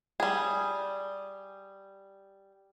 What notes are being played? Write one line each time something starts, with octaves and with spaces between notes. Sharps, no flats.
G3 G#4